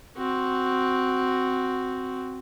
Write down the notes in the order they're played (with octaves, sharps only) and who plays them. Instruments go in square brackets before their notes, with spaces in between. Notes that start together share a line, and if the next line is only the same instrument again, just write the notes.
[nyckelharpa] C4 F#4